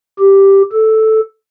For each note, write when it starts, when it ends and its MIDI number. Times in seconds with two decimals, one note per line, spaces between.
0.19 0.62 67
0.72 1.20 69